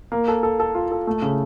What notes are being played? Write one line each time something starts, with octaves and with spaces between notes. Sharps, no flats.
A#3
A4
A4
A4
F4
A4
A3
C#3